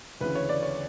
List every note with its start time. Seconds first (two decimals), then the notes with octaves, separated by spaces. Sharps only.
0.21 D2 C#3 E3 B4
0.35 C#5
0.49 D5
0.63 C#5